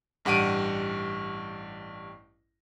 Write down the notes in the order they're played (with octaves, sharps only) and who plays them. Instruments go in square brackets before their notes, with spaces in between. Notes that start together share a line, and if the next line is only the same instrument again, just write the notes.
[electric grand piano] A1 G2 G4 F#5 D7 D#7